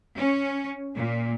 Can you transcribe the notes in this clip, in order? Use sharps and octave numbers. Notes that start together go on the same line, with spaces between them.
C#4
A#2